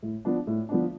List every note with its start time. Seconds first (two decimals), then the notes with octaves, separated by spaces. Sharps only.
0.03 A2
0.25 F3 B3 D4
0.47 A2
0.69 F3 B3 D4